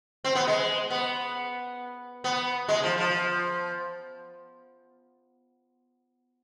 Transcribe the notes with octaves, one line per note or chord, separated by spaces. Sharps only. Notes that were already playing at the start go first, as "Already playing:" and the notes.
C4
B3
G#3
B3
B3
G#3
F3
F3